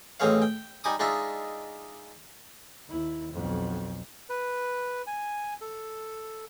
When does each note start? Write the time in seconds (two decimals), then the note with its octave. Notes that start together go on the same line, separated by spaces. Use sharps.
0.20 A1 G#3 C4 G#4 C#5 F5
0.42 G5
0.84 G3 D#4 G#5 D6 D#6
0.99 G#3 D4 D#4 F4 E5
2.88 D#2 E4
3.33 B1 F2
4.30 B4
5.07 G#5
5.61 A4